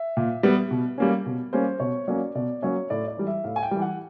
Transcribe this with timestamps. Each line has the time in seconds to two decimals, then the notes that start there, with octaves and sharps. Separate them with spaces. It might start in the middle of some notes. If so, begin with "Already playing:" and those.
Already playing: E5
0.17 A#2
0.43 G3 B3
0.71 B2
0.98 G3 A#3 C#4
1.26 B2
1.53 G3 A#3 C#4 C5
1.80 B2 C#5
2.07 F#3 A#3 C#4 D5
2.35 B2 D5
2.62 F#3 A#3 C#4 C#5
2.90 A2 D5
3.08 D5
3.17 E3 G3
3.27 E5
3.44 A2 F5
3.56 G#5
3.63 G5
3.71 E3 G3
3.82 F#5